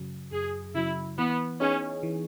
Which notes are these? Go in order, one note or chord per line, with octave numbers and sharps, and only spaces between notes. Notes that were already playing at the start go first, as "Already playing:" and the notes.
Already playing: F#2 C#3 F#3
F#2 G#4
C#3 F#3 E4
E3 B3
B3 C#4 D#4 G#4 C#5
E3